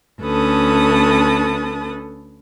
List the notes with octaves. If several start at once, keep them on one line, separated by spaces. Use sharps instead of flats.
D2 C#4 A4 B4 A5 D#6